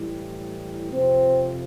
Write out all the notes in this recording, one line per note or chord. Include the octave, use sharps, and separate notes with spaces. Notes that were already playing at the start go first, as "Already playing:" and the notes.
Already playing: A2 E3 G3
F2 C3 F3 C4